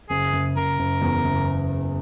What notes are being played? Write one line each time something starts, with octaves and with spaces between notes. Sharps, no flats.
F#1 G#4
F#1
F#1 A#4
F#1
E2
F#1